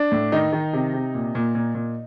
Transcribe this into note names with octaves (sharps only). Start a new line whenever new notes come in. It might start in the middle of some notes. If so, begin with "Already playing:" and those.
Already playing: D4
A2
D#3 D#4
D#3
C3
C3
A#2
A#2
A#2
A#2